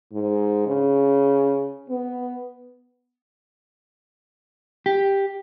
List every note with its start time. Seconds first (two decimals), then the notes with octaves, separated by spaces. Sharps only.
0.13 G#2
0.67 C#3
1.89 B3
4.86 G4